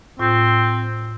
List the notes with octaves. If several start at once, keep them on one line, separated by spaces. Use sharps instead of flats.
A2 C4 F4